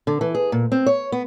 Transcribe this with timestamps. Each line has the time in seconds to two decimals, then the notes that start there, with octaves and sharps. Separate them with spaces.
0.07 D3
0.21 E3
0.35 G#4
0.52 A#2
0.72 C4
0.86 C#5
1.12 B3